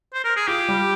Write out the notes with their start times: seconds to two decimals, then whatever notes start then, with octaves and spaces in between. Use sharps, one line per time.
0.14 C5
0.24 A#4
0.36 G#4
0.48 F4 G4
0.68 G3